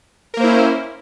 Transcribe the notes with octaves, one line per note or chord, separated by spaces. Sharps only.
A#3 C#4 E4 A#4 C5